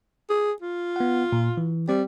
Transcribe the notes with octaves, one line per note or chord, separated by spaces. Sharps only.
G#4
F4
B3 F#5
A#2
E3
G3 C4